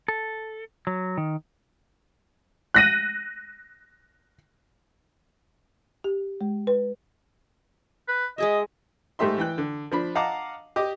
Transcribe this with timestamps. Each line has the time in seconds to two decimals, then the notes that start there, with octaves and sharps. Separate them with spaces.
0.08 A4
0.87 F#3
1.17 D#3
2.74 F#6 A#6 D#7
6.04 G4
6.41 G#3
6.67 B4
8.08 B4
8.38 G#3 G#4 D#5 E5
9.19 G#2 G3 A3 G4 E5 C6
9.38 E3 G5 F#6
9.58 D3
9.92 F3 D4 B5
10.15 D#5 F5 F#5 A5 A#5 D6
10.76 G4 D#5 D6